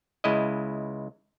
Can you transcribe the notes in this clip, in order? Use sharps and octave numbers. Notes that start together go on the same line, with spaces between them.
C#2 G#3 E4 D#5